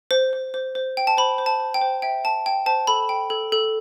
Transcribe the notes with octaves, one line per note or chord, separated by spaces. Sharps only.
C5
C5
C5
C5
G5
A5
C5 B5
C5
A5
C5
G5
C5
E5 G5
G5 A5
G5
C5 A5
A4 B5
G5
A4
A4